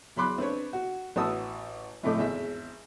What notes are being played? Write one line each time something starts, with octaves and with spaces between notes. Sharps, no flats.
E2 F#3 B5 C6 D6 F#6
C4 D4 B4 C#5
F#4
A1 F#4 B4 A5 D#6 E6
G#1 F2 A2 A3 D#5 D6
G#1 E2 G#3 E5